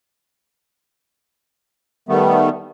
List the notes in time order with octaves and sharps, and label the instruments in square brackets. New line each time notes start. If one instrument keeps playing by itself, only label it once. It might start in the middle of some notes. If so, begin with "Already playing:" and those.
[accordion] D#3 G3 A3 B3